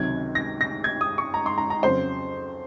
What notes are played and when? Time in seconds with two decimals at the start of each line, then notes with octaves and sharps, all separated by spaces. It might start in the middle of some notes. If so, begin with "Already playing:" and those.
Already playing: C#2 C3 D#3 F#3 G#6
0.35 A#6
0.61 A#6
0.84 G#6
1.01 D#6
1.18 C#6
1.34 A#5
1.46 C6
1.58 A#5
1.70 A#5
1.83 F2 C#3 F#3 C5